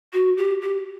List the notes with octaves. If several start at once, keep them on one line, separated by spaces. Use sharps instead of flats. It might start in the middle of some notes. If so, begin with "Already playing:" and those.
F#4
G4
G4